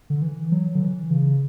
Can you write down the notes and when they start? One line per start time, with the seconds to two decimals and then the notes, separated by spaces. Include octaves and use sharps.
0.10 D3
0.22 E3
0.52 F#3
0.75 D3
0.82 E3
1.11 C#3